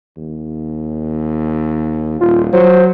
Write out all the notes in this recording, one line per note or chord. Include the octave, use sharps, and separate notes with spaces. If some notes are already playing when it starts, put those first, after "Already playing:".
D#2
D#1 F4
F#3 C5